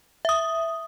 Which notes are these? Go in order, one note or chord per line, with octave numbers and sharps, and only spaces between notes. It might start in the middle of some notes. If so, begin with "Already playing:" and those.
E5 D#6